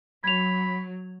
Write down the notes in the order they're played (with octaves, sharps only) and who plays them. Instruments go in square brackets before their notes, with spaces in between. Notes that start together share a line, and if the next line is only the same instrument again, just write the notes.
[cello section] F#3 [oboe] B5 [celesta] G#6 F7